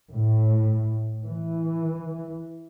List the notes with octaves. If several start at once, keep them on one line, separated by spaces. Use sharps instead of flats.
A2
E3